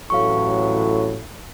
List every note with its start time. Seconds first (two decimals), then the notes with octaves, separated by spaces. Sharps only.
0.10 A1 A2 F#3 F5 C#6